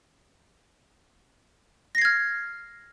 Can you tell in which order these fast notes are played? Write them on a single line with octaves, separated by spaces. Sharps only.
A#6 C7 G#6 F6